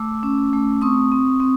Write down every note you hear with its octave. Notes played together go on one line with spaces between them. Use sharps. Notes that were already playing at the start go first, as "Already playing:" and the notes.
Already playing: A3 D6 E6
C#4
A3
C4 C#6 D#6
C4
C4